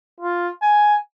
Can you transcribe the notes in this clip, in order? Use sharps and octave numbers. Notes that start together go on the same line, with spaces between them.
F4
G#5